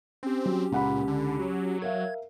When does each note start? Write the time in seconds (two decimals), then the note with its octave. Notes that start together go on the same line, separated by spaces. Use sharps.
0.23 C4 C#4 G4
0.45 F#3
0.72 C#2 A#2 F#5 B5
1.08 D3
1.39 F#3
1.82 A#4 E5 F5 G#6